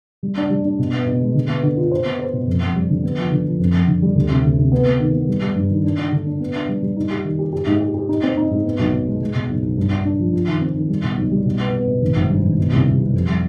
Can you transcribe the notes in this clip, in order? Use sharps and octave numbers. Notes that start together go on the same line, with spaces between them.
G3
D4
G3
D4
B2
B3
B2
G#3
D3
B3
D3
F4
C5
B3
C5
B2
F2
F2
G3
D3
B3
F3
D3
F3
F2
F2
D3
G3
D2
C3
D2
C3
B3
B3
D#3
B3
G3
G3
G2
D#3
D4
D4
D3
D4
B3
D4
G3
G3
D#4
G4
D#3
G4
G4
G#2
G4
G4
D#4
C4
D#4
G#2
B3
B1
B2
G#3
G#3
B2
B1
B1
G2
D4
D4
F3
F4
D#3
C4
D#3
G3
B2
B1
G3
B2
B3
B3
B2
G#1
G#1
G2
G#1
B2
C2
C2
G3
F2
G3